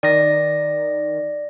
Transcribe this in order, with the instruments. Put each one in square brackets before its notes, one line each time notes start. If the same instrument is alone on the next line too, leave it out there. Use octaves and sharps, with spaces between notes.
[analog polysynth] D#3 [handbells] D5 A#6